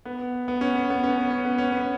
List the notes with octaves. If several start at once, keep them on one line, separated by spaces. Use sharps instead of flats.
B3
B3
C#4
B3
B3
C#4
B3
C#4
B3
C#4
B3